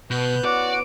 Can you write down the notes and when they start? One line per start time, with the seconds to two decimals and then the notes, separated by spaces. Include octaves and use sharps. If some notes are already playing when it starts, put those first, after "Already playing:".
0.10 B2 B3 B4 F#6 G6
0.45 C#4 E4 F#4 D5 F#5 D6